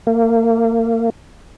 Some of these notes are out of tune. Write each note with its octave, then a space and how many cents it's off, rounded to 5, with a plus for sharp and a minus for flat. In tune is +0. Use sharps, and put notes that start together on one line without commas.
A#3 -30